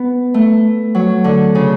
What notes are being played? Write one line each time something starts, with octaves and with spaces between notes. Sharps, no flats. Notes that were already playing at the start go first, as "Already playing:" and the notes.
Already playing: B3
A3
F#3
D3
C#3